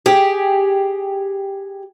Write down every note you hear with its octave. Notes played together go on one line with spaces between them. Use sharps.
G4 G#4